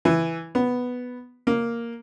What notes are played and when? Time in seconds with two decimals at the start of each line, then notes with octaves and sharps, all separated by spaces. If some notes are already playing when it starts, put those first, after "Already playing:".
0.05 E3
0.55 B3
1.47 A#3